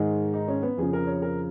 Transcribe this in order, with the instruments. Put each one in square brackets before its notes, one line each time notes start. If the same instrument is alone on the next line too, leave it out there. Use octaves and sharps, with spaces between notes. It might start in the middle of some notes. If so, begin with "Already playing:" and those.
Already playing: [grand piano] G#2 D#3 G#3 G#4
D#4
C#4
B3
F2 C#3 F3 G#4
A#4
C#5
A#4